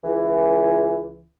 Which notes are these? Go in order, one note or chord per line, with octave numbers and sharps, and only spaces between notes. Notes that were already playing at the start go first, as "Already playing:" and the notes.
C#2 E3